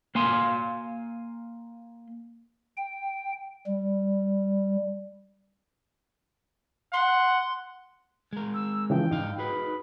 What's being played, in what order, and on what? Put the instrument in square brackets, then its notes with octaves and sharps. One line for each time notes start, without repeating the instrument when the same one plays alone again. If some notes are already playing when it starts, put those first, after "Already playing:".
[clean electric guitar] A#3 F5 G#5 C6
[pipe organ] G5
G3
[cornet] F#5 [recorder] C6
[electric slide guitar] G#3 A#4
[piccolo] E6
[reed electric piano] C#3 E3 F3 [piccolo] G5
[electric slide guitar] G#2 F5 [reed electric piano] D#4
[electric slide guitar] F#4 G#4 B4 [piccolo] B5